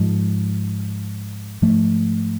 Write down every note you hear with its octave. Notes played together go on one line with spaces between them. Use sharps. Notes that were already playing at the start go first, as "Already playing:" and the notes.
Already playing: G#2 F3 G#3
G#2 F3 A3